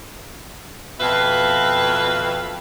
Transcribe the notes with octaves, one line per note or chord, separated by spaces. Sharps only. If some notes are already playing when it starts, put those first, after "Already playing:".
F2 B2 B4 E5 F5